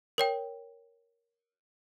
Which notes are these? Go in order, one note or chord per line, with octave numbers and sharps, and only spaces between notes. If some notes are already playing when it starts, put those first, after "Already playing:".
A#4 C#5 G5